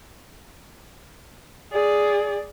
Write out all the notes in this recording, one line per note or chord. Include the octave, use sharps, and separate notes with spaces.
G#4 D5